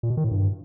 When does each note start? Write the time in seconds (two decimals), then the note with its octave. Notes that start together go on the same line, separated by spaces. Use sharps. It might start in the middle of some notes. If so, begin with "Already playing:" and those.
0.03 A#2
0.10 B2
0.17 D#3
0.24 A2
0.31 G2